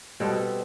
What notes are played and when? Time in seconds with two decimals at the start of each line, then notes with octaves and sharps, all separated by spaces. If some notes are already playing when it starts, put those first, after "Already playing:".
0.20 B2 G3 C4 A4